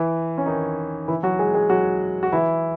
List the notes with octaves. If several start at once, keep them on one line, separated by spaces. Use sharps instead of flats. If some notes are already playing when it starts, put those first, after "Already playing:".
Already playing: E3 E4
C#4
D#3 D#4
E3 E4
F#3 F#4
G#3 G#4
G#3 G#4
F#3 F#4
F#4
E3 E4